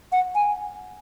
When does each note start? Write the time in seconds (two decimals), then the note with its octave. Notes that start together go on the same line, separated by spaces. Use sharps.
0.12 F#5
0.35 G#5